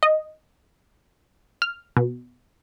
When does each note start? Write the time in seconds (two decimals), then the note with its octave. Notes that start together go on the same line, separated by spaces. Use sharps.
0.03 D#5
1.62 F6
1.97 B2